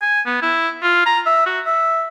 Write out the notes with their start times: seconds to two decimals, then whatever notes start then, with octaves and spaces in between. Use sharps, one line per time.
0.02 G#5
0.26 B3
0.42 E4
0.83 F4
1.06 A#5
1.26 E5
1.46 F#4
1.66 E5